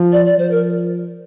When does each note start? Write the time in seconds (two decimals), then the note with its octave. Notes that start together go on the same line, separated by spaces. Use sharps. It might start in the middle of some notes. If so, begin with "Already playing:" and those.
Already playing: F3
0.12 D5
0.26 D5
0.38 F3 C5
0.51 A#4